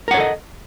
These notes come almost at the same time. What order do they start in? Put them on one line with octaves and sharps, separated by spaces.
A#4 F#5 C#5 A4 D#5